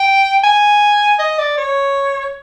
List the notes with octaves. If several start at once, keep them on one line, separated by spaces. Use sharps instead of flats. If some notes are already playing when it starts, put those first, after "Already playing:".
Already playing: G5
G#5
D#5
D5
C#5